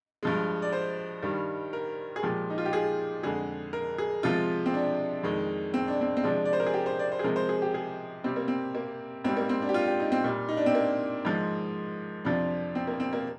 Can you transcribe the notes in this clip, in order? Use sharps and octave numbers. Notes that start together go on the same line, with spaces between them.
G2 F3 G#3
D5
C5
G2 D#3 G3
A#4
G#4
A#2 F3 G#3 G4
D#4
F4
G4
G#4
F2 D3 G#3 G#4
A#4
G#4
C3 F3 G#3 F4
C4
D4
F2 D#3 G#3
C4
D4
C4
C4
C3 F3 G#3 D4
D5
C5
A#4
G#4
G4
C5
D5
C5
G#4
C3 F3 G#3 A#4
C5
G#4
G4
G#4
C3 G3 C4
A#3
C4
A#3
G#2 G3 C4
A#3
C4
D4
G4
F4
G4
D#4
C4
A#2 G3
D#4
D4
C4
A#3
G#2 F3 G#3
F2 C3 F3 D4
C4
A#3
C4
A#3